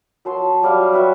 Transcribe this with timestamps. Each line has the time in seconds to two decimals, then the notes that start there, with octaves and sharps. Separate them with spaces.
0.25 F#3 A5 C6
0.62 F#3 G3 F5 D6
0.93 F#4 B4 E5